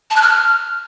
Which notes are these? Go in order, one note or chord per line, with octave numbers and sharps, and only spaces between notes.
A5
F#6
F6